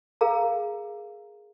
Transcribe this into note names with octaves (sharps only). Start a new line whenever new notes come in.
G#4 A#4 F5 A#5